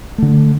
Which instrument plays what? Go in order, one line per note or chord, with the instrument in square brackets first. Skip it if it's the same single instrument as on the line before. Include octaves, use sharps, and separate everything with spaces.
[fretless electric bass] D3 A3